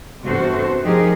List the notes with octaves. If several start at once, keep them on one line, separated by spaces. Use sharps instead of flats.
E2 G2 C3 F#4 A4 C5
F3 A3 D#4 G4 G#4 A#4